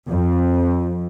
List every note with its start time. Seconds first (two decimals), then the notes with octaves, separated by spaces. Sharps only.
0.10 F2